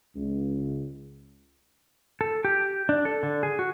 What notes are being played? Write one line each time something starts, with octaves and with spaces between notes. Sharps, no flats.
C#2
A4
G4
D4
A4
D3
G#4
F#4